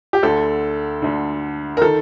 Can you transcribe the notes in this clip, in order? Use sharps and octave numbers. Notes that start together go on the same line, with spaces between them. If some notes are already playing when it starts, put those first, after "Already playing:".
G4
D2 D3 A4
D2 D3
A#4
D#3 A4